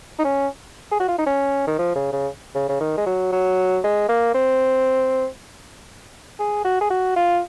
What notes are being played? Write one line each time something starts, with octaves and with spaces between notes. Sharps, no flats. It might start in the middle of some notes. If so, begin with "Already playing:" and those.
D#4
C#4
G#4
F#4
F4
D#4
C#4
D#3
F3
C#3
C#3
C#3
C#3
D#3
G#3
F#3
F#3
G#3
A#3
C4
G#4
F#4
G#4
F#4
F4